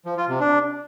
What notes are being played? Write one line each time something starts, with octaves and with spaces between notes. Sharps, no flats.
F3
F4
C3
D4